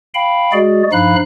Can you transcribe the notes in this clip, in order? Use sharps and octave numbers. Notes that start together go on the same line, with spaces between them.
F5 G5 B5
G#3 F#4 G#4 D5
G2 F3 D#4 F5 B5 F#6